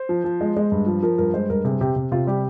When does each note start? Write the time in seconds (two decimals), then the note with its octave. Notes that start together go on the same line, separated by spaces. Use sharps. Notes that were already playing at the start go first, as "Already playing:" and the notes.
Already playing: C5
0.09 F3
0.24 F3
0.41 G#3
0.57 G#3
0.72 G2
0.87 F3
1.03 F3 A#4
1.18 G2 A#4
1.34 G#3 C5
1.50 G2 A#4
1.65 C3 G#4
1.80 C3 G4
1.96 C3
2.12 C3 F4
2.27 G3 G4